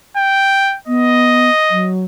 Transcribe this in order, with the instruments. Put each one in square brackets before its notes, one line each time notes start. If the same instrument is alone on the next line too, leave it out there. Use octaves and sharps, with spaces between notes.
[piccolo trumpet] G5
[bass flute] B3 [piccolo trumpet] D#5
[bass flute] F#3